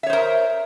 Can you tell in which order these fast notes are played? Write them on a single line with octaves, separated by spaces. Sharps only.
E5 C#5 C5 A#4